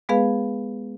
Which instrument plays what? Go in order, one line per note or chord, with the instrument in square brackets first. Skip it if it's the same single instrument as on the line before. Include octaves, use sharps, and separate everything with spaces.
[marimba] G#3 B3 G#4 B4 F5